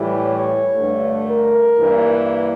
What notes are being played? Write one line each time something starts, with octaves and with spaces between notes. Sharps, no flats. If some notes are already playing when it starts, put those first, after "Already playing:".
Already playing: A2 E3 G3
C#5
G2 D3 A3
A#4
G2 E3 A#3